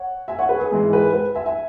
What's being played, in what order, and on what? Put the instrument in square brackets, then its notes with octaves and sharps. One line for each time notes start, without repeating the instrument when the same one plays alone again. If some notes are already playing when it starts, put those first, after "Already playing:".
Already playing: [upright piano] C#5 F#5
E5 G#5
C#5 F#5
B4
G#4
G#2 E3 G#3 G#4
B4
B4
E5 G#5
E5 G#5